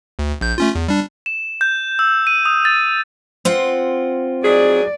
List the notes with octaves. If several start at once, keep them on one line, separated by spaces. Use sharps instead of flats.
D2
A#1 G6
A3 C#4 F4
E2
G3 D4
E7
G6
E6
D#7
D#6
A6
C4 F4 F#5
F#3 D#4 G#4 D5